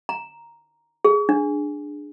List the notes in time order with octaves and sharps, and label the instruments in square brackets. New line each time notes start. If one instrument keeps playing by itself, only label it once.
[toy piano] A#5
G#4
D4